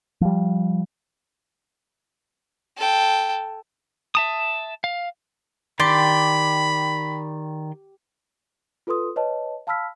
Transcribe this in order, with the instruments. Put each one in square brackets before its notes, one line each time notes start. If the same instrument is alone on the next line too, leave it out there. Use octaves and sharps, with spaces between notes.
[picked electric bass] F3 G3
[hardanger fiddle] A4 G5
[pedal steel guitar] E5 A5 D#6
F5
[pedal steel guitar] D#3 D5 C6 [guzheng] G4 [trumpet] B5
[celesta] F4 A4 B4 C6 D#6
B4 C#5 D#5 A5
F5 A5 B5 E6 F6 B6